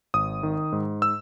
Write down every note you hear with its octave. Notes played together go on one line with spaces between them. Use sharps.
G#1 D#6
D#3
G#2
E6